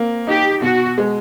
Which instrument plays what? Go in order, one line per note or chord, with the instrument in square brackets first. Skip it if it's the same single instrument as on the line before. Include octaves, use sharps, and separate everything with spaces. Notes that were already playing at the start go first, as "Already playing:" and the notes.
Already playing: [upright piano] A#3 C4
[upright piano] D#4 [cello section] G4
[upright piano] B2 [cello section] F#4
[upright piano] G#3